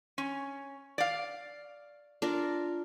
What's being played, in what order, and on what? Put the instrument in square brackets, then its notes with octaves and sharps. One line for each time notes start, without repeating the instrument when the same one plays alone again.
[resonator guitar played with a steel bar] C#4
D5 F5
[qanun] D4 F4 A#4